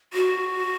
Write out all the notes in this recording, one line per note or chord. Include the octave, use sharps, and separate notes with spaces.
F#4